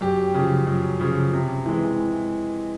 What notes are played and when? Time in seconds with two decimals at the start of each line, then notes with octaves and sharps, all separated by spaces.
0.01 F#2 G4
0.34 C#3 F3
0.67 F#2
1.00 C#3 F3
1.33 C3
1.66 E3 G#3